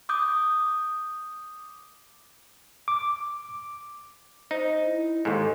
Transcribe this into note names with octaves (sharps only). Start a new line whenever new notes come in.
D6 D#6 G6
D6
D#4 C5
E4
D#2 G#2 A4